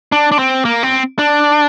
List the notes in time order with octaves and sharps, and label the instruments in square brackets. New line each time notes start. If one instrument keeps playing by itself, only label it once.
[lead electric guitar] D4
D4
C4
A#3
C4
D4